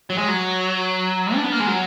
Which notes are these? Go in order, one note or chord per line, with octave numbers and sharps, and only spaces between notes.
F#3
G#3
F#3
D4
B3
A#3
G#3
F#3